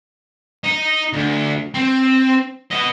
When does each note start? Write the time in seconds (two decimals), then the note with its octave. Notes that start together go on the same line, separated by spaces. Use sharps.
0.64 D#4
1.13 D2
1.74 C4
2.71 B3 D#5